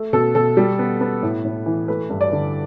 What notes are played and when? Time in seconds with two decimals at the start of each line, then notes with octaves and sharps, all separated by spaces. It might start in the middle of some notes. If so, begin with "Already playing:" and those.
Already playing: A3
0.13 B2 A4
0.35 B2 A4
0.57 G3
0.79 B3
1.01 B3
1.23 A2
1.45 A2
1.66 E3
1.88 A3 B4
2.10 G2
2.21 D5
2.32 D3